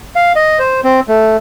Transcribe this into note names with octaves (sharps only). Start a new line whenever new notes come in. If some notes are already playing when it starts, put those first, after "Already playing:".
F5
D#5
C5
C4
A3